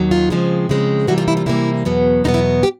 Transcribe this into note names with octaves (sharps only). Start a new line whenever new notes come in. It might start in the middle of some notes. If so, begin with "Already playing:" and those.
Already playing: D#2 D#3 F#3
F4
C#3 F3 G#3 C4
C#3 F3 G#3 C4
C3 E3 G3 A#3 F#4
F4
E4
F4
C3 E3 G3 A#3 E4
E2 B2 F#3 B3
E2 B2 F#3 B3 D#4
E4
G4